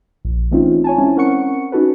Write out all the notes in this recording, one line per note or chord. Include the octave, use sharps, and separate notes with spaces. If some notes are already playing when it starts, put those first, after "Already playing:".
A#1
E3 A3 C4 C#4 D#4 F4
C#5 G#5 A5
G#3 C4 C#4 E4
C4 C#4 A#4 F#5 C#6 C#7
C#4 D#4 F#4 A4 B4